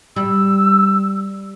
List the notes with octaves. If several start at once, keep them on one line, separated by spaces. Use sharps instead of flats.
G3 E6